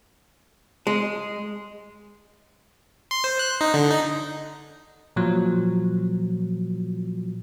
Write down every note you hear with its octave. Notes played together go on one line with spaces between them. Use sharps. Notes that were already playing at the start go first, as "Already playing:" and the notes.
G#3
C6
C5
F#6
D#4
D3
D#4
A#2 F3 F#3